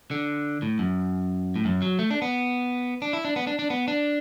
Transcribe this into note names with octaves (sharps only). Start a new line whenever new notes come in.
D3
A2
F#2
A2
F#2
F#3
A3
D4
B3
D4
E4
D4
B3
D4
D4
B3
D4